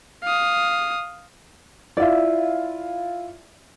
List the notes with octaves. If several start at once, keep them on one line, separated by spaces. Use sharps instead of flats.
F5 D#6
E4 F4 D5 E5